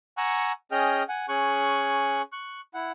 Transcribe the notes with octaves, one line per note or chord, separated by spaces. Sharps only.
F#5 G#5 A#5 C#6 E6 F#6
C#4 G#4 D#5 G5 F6
F#5 G#5
C#4 G#4 G#5 C#6 F#6
C#6 F#6
E4 F#5